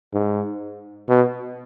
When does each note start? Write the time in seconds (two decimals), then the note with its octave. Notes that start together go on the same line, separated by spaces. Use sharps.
0.14 G#2
1.08 B2